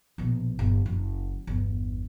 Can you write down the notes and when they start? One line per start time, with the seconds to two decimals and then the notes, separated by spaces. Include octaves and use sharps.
0.18 A#1 B2
0.59 G1
0.86 F#1
1.47 G1 E2